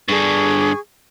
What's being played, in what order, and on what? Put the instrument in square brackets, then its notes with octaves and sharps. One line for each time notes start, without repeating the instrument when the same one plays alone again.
[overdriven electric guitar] G2 D3 [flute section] G#4 C#6